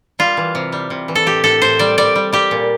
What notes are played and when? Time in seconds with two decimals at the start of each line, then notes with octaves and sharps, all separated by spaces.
0.19 G3 F4
0.37 E3
0.55 C3
0.72 G3
0.90 C3
1.08 E3
1.15 A4
1.26 A2 G4
1.44 A2 A4
1.62 A2 C5
1.79 G3 D5
1.98 G3 D5
2.16 G3
2.33 G3 G4
2.51 A#2